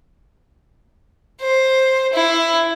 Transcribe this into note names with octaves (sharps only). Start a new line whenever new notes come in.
C5
E4